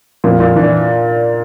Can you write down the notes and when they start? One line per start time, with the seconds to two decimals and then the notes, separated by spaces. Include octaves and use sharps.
0.24 F2 A#2 F3
0.40 A#2
0.56 E3 D4